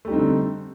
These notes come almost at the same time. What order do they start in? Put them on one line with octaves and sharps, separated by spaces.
A3 G3 D#4 C4 D3